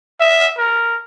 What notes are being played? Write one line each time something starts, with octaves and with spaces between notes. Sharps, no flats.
E5
A#4